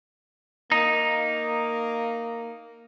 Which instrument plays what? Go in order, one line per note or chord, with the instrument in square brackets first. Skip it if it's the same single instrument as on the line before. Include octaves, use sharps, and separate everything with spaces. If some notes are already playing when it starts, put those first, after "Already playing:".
[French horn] A#3 [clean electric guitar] D#4